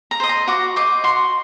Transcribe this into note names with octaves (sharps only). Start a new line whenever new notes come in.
A#5
C5 D#5
A#5
F#4 D6
C5 D#5 D6
F#4 C6